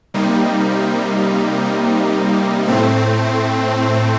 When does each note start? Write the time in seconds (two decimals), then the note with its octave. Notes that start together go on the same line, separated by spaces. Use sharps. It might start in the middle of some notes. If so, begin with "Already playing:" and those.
0.14 C3 G3 A#3 D#4
2.68 A2 A3 C4